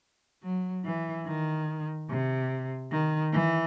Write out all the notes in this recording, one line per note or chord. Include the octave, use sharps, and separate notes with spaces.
F#3
E3
D#3
C3
D#3
E3